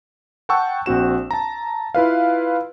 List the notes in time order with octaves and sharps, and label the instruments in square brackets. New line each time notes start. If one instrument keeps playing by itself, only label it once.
[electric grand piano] F#5 G5 A5 C#6 E6
A#1 C4 F#4 E7
A5 A#5
E4 F4 B4 F5